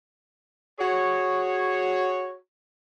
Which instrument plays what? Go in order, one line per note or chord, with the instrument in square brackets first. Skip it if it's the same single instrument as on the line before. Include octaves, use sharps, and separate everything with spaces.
[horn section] F#4 G#4 C#5